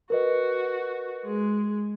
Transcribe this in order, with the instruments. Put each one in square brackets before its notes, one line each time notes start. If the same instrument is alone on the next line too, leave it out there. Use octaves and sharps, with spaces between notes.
[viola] F#4 [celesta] A#4 B4 D#5
[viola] G#3